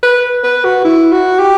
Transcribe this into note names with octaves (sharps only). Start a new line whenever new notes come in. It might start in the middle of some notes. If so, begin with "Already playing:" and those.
B4
B4
F#4
E4
F#4
G4